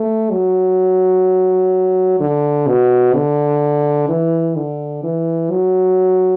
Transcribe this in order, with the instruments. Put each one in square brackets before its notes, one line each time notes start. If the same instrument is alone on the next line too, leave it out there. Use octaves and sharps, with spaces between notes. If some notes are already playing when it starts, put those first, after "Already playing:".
Already playing: [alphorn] A3
F#3
D3
B2
D3
E3
D3
E3
F#3